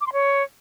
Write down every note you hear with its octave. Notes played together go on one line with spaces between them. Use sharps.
D6
C6
C#5